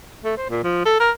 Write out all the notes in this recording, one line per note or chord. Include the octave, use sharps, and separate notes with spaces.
A3
C5
A#2
F3
A4
A#4